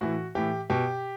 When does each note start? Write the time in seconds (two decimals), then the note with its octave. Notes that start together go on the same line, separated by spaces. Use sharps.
0.01 A2 E3 F#4
0.35 A2 E3 G4
0.70 B2 G4